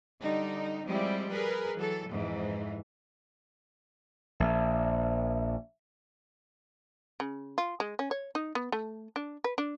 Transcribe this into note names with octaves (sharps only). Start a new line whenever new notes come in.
D3 G3 D#4
F3 G3 G#3 C4 E4
G#4 A#4 B4
E3 F#3 A4
F2 G#2 E3
A#1 E5
C#3
F4
G#3
C#4
C#5
D#4
B3
A3
D4
B4
D4